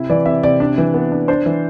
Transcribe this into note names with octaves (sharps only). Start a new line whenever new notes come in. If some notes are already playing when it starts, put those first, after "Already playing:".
Already playing: C3 E4
E3 D5
C3 E5
C3 D5
D4
E3
B3
D4
D4 C5
E3